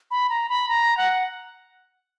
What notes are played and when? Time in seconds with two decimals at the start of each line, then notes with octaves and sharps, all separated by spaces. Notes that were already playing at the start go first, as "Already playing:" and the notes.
0.11 B5
0.30 A#5
0.49 B5
0.69 A#5
0.97 F#5